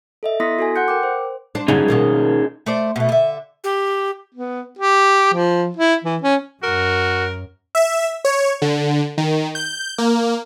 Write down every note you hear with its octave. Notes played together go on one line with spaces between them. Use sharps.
A4 D#5 E5
B3 E4 C6 D#6 A#6 B6
F#4 A4 G#5
F#5 C6 F#6 G6 C#7
A#4 G5 D6
C5
D4 C5
G2 D3 C#4 D#4 G#4
B2 D#3 A#3
A3 C5 D5
B2 A3
D3 E5
G4
B3
G4
F3
E4
E3
C#4
F#2 F#4 A#4
E5
C#5
D3
D#3
G6
A#3